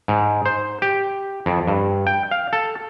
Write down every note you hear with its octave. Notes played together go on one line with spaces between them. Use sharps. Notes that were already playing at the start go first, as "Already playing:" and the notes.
G#2
C5
G4
F2
G2
G5
F5
A4